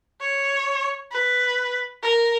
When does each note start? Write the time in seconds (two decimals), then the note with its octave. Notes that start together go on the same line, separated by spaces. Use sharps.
0.21 C#5
1.12 B4
2.03 A#4